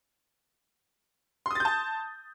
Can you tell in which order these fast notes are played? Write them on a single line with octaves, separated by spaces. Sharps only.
C6 D#6 A6 G6 A5